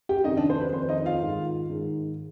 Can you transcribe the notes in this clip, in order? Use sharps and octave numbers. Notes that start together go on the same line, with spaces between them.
G4 G5
F2 C3 D#3 D#4 D#5
D4 D5
C5
B4
F2 D#3 C5
D#4 D#5
F4 F5
G#2 D#3
G#2 D#3